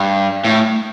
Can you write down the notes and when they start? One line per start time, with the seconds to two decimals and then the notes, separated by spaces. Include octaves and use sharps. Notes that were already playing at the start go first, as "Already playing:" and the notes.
Already playing: G2
0.45 A2